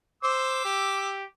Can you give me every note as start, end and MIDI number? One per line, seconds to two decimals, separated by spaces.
0.23 0.62 72
0.23 1.08 86
0.23 1.08 88
0.65 1.24 67